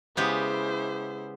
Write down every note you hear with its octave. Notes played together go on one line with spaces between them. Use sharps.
C#3 G#3 B3 E4 G4 B4 C5